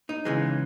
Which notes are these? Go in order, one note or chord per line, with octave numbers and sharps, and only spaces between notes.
D#4
C#3 E3 G#3